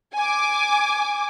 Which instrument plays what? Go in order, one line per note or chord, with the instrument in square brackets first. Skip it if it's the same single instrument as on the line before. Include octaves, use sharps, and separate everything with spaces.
[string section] G#5 D6